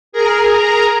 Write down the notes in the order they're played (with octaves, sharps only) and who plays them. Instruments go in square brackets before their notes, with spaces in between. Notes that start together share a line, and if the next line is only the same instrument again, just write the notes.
[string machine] G#4 A#4 A#5